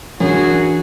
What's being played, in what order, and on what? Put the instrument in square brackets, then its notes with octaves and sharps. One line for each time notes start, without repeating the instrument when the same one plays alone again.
[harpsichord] F#2 [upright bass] E3 D4 [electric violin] F#4 [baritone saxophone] G#4